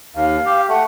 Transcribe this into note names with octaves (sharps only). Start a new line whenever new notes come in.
D#2 F5
G4
A3 F#5